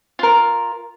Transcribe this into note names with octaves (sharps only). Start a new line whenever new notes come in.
F4 A#4